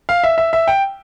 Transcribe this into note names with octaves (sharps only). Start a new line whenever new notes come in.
F5
E5
E5
E5
G5